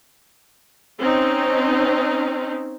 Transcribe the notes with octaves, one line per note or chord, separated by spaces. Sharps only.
C4 C#4 D#4